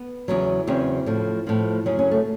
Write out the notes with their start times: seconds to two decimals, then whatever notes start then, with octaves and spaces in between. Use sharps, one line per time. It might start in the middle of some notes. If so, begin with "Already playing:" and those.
Already playing: B3
0.28 E2 C#3 F#3
0.67 E2 C#3 F#3 C4
1.06 A2 F3
1.47 A2 F3
1.86 F#2 C#3 F#3 C#4
1.99 C#4
2.11 A3